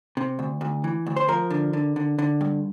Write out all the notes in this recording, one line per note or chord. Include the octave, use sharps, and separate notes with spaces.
C3
D2
D2
E3
D2
C5
F3 A#4
D3
D3
D3
D3
G2